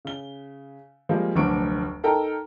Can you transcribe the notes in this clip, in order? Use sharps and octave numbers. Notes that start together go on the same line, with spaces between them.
C#3 G7
F3 G3 G#3 A#3
F1 D2 F#3 D4 C#6 D7
D#4 A4 A#4 G5 A#5